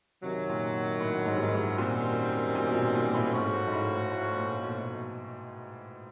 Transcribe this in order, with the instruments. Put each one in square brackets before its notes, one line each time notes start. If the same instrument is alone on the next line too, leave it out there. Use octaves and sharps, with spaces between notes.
[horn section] F#2 D#3 F#3 [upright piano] C3
[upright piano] A#2
A2
G#2
G2
G#2
A2
[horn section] F#2 D#3 G3 C4 [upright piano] A#2
[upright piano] A#2
B2
A#2
A#2
A2
[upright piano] G#2 [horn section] F3 A3 C#4 F#4
[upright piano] G#2
A2
A2
A#2
B2